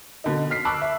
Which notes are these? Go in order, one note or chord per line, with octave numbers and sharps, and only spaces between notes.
B2 D3 D#4
F6 B6 C7
A5 B5 C#6 D6 E6 F#6
E5